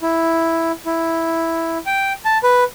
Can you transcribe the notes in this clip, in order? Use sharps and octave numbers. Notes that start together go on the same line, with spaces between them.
E4
E4
G5
A5
B4